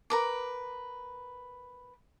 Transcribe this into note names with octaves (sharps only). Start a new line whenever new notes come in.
A#4 B4 D6